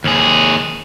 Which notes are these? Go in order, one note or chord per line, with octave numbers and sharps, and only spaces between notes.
D#2 G#4